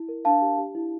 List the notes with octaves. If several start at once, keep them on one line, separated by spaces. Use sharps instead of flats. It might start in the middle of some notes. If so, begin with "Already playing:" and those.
Already playing: E4
A#4
D4 F5 A5
G4
G4
E4